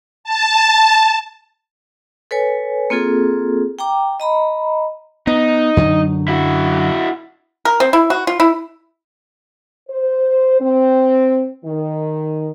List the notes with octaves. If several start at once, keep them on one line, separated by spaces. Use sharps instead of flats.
A5
A4 B4 C#5 G#5
A#3 C4 F4 G#4 A4
G5 A#5 D6
D#5 A#5 B5
B3 D#4
F#2 D3 F#3
E4 F#4
A#4
C4
E4
F#4
F4
E4
C5
C4
D#3